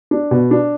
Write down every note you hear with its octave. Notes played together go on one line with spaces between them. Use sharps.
D4
B2
D4